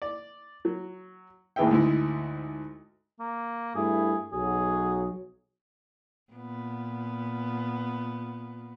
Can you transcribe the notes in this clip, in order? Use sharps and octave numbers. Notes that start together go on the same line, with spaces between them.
D5
F#3
A1 D#2 B3 G#4 E5 G5
D2 G#2 E4
A#3
G2 A3 E4 G#4
B1 F#3 G#4
A#2 B3